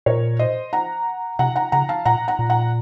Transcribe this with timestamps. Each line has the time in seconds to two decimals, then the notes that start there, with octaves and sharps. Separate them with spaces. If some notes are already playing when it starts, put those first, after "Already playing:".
0.06 A#2 A#4 C#5
0.39 C5 D#5
0.73 F#5 A#5
1.39 C3 F#5 A#5
1.56 F#5 A#5
1.72 C#3 F#5 A#5
1.89 F5 A5
2.05 A#2 F#5 A#5
2.28 F#5 A#5
2.39 A#2
2.50 F#5 A#5